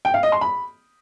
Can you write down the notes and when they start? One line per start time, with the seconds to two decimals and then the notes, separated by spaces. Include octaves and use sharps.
0.05 G5
0.14 F5
0.23 D#5
0.32 C6
0.41 B5